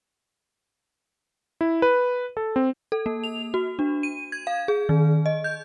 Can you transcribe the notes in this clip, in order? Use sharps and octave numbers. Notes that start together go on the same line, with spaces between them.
E4
B4
A4
C4
A4
A#3
F7
F#4
D4
D#7
G#6
F5
G#4
D#3
D#5
G6